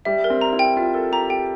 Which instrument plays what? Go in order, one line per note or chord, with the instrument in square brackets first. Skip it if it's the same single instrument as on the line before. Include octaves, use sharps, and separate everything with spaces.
[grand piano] G3 [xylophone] E5
[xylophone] A#4
[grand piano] C4
[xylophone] A#5
[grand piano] E4
[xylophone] G5
[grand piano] F4 [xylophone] E5
[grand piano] A4 [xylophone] A#4
[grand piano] G4 [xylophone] A#5
[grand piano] G4 [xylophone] G5